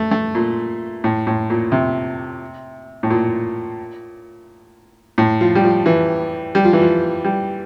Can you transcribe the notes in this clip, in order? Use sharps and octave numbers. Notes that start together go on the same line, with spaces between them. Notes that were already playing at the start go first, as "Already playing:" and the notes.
Already playing: A3
A3
A#2
A2
A2
A#2
C3
A2
A#2
A2
F3
G3
F3
E3
G3
F3
E3
F3
G3